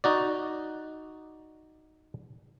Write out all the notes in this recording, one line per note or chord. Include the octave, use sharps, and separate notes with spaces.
D#4 F#4 D5